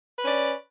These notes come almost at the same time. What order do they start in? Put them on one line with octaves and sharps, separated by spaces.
B4 C#4 D5